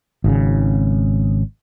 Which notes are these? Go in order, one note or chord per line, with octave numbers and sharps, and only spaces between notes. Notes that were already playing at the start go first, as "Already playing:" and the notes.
G#1 C#3